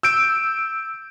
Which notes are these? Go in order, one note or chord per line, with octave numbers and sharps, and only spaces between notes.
E6 G6 D7